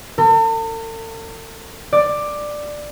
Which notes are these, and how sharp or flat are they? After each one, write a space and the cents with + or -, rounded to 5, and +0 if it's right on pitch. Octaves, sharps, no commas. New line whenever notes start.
A4 +45
D5 +10